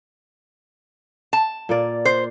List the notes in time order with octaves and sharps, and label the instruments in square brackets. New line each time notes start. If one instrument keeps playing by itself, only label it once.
[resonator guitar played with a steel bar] A5
[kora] A#2 A#3 D5
[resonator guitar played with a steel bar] C5